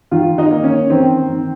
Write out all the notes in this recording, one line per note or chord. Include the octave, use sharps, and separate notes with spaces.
D#3 F4
D#4
A#3
C#4
D#3 C4
D#3